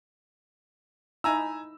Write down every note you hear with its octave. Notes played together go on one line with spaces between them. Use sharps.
D#4 E4 G#5 A#5 E6